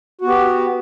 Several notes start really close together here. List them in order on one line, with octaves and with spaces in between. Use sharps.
F#4 B3 G4